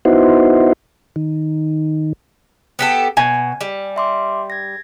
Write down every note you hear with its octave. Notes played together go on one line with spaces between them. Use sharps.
B3 D#4 E4 F#4 C5
D#3
B3 G4 A4
B2 G#5
G3
E5 C6 D6
G#6 A#6